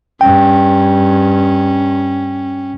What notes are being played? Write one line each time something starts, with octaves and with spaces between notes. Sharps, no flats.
G2 C#4 G5